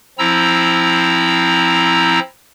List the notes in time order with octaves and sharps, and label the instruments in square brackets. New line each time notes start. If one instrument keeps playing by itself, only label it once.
[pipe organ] F3 C4 E4 A#5 E6